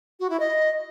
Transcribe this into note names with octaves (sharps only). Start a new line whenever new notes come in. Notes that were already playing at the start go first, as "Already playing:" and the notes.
F#4
E4
D#5